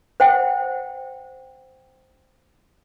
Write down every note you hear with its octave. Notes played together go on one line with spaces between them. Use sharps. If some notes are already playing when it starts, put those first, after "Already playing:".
C5 F#5 G5